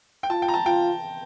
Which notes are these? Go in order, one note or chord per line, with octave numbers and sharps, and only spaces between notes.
G5
F4 A5
G5
A#5
A5
F4 G5